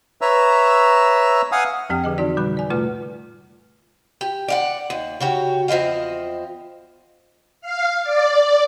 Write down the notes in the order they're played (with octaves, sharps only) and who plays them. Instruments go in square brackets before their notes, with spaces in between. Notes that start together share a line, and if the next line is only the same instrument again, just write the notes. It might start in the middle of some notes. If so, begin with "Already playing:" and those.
[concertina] B4 C#5 E5 A#5 E6
F5 F#5 G#5 D#6
[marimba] F2 F3 C4 G4 G5 F6
D3 G#4 D#5
E3 C4 D#4 F#4 D5
B2 D3 G3 B5 F#6
D5 G#5
A2 C3 A3 F4 B4 F6
[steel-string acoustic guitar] G4
D5 F5 F#5
D#2
C#3 F#4 G4
E2 F3 C4 D#5 F5
[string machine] F5
D5